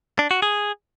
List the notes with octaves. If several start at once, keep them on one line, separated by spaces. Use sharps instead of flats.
D4
F#4
G#4